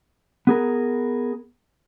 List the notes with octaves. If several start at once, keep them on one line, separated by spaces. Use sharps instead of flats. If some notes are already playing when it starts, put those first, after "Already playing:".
B3 G#4 A#4